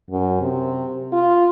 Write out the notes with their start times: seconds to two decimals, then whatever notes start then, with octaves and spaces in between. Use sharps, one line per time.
0.10 F#2
0.41 C3
1.12 F4